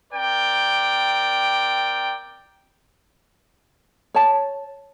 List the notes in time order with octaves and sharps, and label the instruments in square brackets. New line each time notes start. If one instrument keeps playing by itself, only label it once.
[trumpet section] C4 A#4 D5 G5
[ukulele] C#5 A5